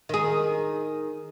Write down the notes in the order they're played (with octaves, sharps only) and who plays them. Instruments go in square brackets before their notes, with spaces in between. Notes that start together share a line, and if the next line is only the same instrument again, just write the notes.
[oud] D#3 G#4